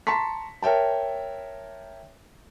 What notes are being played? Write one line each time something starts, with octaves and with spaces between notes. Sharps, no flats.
A5 A#5 C6 C#6 B6
A#4 C#5 E5 G5 A5